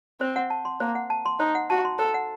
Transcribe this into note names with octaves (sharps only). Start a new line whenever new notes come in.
C4 C5
F#5
A5
C6
A#3 C5
F#5
A5
C6
D#4 C5
F#5
F#4 A5
C6
A4 C5
F#5